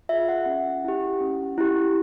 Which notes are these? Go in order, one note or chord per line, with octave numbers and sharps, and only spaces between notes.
F4 G#4 E5
F#5
C#4
E4 G4
C#4
E4 G4